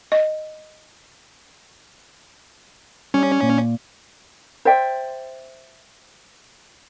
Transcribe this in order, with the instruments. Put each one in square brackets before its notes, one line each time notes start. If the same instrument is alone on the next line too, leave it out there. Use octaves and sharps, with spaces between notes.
[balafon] D#5
[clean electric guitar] G3 [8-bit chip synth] C#4
[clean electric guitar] A#2
[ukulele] C5 D5 E5 G5